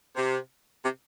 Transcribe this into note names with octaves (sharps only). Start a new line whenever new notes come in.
C3
C3